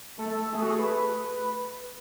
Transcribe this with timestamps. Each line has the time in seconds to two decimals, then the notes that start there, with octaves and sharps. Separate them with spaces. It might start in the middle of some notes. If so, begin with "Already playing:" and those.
0.18 A3 A4
0.53 A3 G#4
0.62 F#4
0.70 G#4
0.79 B4